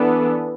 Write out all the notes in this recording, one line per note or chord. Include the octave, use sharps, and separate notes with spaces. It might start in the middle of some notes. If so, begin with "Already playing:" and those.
Already playing: E3 B3 D4 A4